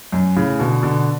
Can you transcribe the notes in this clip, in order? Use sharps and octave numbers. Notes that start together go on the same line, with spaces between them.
F#2
A2 C#3
B2 D3
B2 D3